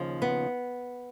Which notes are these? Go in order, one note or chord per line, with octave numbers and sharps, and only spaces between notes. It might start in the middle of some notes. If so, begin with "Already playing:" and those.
Already playing: D#2 C#3 F3
B3